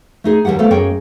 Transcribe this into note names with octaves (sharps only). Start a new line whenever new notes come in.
A3 D#4 G#4
D#2 F3 G3 G4 F#5
A3 B3 A4 C5 D5 F5
F#2 A#3 G#4 C#5 G5